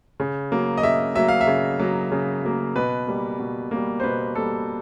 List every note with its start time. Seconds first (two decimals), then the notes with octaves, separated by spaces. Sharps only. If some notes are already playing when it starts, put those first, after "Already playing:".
0.20 C#3
0.52 F#3 A#3
0.77 D#5
0.83 C#3 E5
1.15 F#3 A#3 E5
1.28 F5
1.41 E5
1.47 C#3
1.79 F#3 A#3
2.12 C#3
2.43 F#3 A#3
2.75 B2 B4
3.07 G3 A#3
3.40 B2
3.71 G3 A#3
4.00 C5
4.03 B2 B4
4.35 G3 A#3 A4